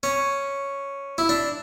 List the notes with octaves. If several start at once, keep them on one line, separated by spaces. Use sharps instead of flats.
C#4
E4
D4